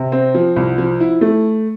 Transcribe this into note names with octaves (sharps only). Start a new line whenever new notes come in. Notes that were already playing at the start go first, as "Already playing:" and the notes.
Already playing: C3
C4
F3
C2
F3
E4
A3